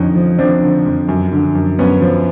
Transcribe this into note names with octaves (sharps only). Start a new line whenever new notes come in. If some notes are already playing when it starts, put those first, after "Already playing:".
Already playing: F2 D3 C#4 D#4
F3
F3 C4 D4
D3
F2
F#2
D3
F#2
F#2 B3 C#4
F3